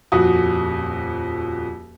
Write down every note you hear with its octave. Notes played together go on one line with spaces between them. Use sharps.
D#1 F2 F#4 D#6